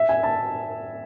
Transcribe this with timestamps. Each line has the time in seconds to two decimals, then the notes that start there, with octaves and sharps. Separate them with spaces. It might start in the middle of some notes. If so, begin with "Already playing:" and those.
Already playing: E5
0.09 G#5
0.23 A5